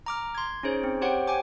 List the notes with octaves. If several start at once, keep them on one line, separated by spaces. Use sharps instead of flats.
A#5 D6 F6
C6 G#6
C#4 D#4 G#4 C5 C#5
C4
G4 C5 C#5 F#5 G5
G5 G#5 D6